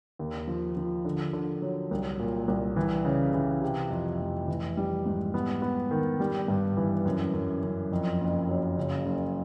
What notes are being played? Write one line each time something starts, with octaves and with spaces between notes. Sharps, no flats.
D#2
F3
F3
D3
D3
F#3
C2
A#2
C2
E3
C#3
E3
C3
F2
F1
E3
G3
G#2
B3
B3
D#3
G3
G2
E3
F#2
F#2
F#2
F2
F#1
F#3
C#3
F#1